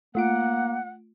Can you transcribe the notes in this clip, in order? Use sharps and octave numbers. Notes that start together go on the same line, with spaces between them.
A3 A#3 F4 F#5 D7